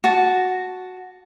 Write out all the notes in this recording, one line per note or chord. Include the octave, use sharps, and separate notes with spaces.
F#4 A5